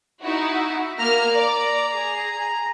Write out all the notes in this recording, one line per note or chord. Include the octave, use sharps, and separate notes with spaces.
D#4 E4 F#4
E5
A#3 A#5 F6
D5
G#4